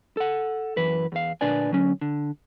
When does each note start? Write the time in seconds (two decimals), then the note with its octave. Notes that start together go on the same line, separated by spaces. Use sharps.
0.17 A4 F#5
0.77 F#2 E3 B4
1.12 E2 F5
1.41 D2 A#2 D4 B4 D5 G#5
1.71 D2 F#3 C#4
2.01 D3